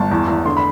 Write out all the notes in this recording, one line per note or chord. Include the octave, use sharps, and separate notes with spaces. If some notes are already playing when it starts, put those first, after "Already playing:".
Already playing: G1 A5
E2
E2
D3 C6
B5